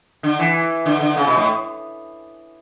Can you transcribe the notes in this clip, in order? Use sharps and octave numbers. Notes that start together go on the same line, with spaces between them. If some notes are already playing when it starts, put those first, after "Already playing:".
D3
E3
D3
D3
C#3
B2
A2